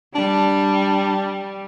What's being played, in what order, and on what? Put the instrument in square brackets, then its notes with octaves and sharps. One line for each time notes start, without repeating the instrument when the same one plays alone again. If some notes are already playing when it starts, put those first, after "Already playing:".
[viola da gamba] G3 [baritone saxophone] D4